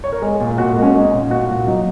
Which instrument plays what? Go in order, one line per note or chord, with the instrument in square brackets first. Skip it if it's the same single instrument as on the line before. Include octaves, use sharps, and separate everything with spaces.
[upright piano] C#5
A#4
G#3 G#4
A#2
A#2 F#4
G#3 A#3
C#4
G#3 D#4
A#2
A#2 F#4
A#2
F#3 D#4